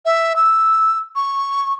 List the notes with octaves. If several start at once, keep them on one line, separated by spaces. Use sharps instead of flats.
E5
E6
C#6